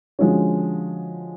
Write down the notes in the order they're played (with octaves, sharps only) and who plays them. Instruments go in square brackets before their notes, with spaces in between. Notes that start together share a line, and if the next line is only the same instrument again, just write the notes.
[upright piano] D3 F3 G#3 C#4 F#4